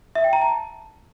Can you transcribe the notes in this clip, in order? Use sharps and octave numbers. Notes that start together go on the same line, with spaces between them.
E5
G5
A#5
A5